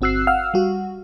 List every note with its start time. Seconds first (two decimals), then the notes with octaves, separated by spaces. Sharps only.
0.01 G1 C4 F#4 E6 F#6 C7
0.27 F5 F#5 E6 F6
0.54 G3 F#4